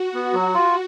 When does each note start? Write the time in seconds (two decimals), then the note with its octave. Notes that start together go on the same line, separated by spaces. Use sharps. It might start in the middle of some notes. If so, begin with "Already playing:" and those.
Already playing: F#4
0.14 B3
0.33 F#3
0.54 F4